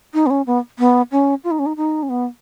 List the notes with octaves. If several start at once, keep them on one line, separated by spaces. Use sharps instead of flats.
D#4
B3
C#4
B3
B3
C#4
F4
D#4
C#4
D#4
D#4
C#4
B3